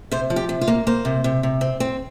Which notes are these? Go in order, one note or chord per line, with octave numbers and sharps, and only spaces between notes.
C3 C5
F3
G4
C3
F4
A#3
A#3 C5
C3
C3
C3
C4
C4